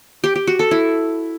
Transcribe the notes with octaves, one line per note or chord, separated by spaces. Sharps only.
G4
G4
F#4
A4
E4